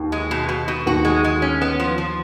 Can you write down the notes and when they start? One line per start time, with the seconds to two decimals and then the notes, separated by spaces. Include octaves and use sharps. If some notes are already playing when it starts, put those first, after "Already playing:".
Already playing: D#2
0.12 G#3
0.31 B2
0.49 B2
0.68 B2
0.86 D#2 D#3 F#4
1.05 G#3
1.24 G#3
1.42 C#4
1.61 B3
1.80 F3
1.98 F3